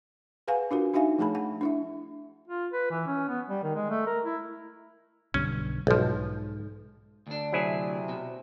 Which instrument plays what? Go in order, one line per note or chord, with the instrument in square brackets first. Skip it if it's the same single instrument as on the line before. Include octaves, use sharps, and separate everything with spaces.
[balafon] G#4 B4 F5 F#5 G#5
D4 F4 F#4 A#4
D4 D#4 F#4 E5 F5 G#5
F3 A3 G#4 A5 B5
F#5
D4 E4 E5
[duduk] F4
B4
E3
C#4
B3
G3
D#3
G#3
A3
A#4
E4
[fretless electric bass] B1 G2 D3 [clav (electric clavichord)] C#4
[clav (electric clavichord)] B1 F3 [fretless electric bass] G#2
[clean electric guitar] D2 D4
[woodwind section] C3 [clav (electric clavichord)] F#3 E4 G#4
[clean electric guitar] B2